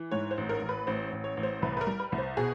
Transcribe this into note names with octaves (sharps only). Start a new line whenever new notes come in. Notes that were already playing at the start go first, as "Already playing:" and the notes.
Already playing: E3
G#2 C#5
C5
A1
A#4
A1
B4
A1 C5
A1
C#5
A1
C5
C2 B4
B4
A#4
G3
B4
C2
C5
B2 G#4